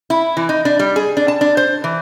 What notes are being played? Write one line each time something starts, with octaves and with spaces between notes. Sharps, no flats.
E4
E3
D#4
D4
G3
G#4
D4
A5
D4
C5
E3